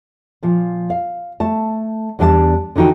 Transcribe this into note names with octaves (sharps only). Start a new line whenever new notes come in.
A#2 F3
F5
A3 A5
E2 G3 D4 G5 A5
D3 E3 D#4 F#4 G5